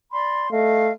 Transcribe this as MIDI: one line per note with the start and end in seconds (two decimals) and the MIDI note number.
0.11 0.50 74
0.11 0.50 83
0.11 0.50 84
0.51 0.90 57
0.51 0.91 75
0.51 0.91 77